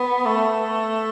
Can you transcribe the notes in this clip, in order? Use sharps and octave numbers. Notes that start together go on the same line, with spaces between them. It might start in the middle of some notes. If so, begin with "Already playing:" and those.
Already playing: B3
A3